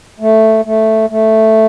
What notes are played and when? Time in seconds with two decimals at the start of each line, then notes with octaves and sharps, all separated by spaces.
0.20 A3
0.65 A3
1.10 A3